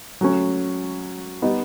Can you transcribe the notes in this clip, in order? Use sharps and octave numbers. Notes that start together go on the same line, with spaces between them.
F#3 A3 C#4
G3 B3 D#4